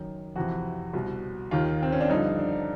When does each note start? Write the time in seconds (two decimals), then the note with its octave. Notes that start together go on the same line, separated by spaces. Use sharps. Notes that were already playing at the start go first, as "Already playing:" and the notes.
Already playing: F#2 D#3
0.36 F2 C3 E3 F#4
0.93 C2 B2
1.51 D#2 D#3 F4
1.83 C4
1.92 C#4
2.01 D4
2.10 G2 D3 F3 D#4
2.38 D4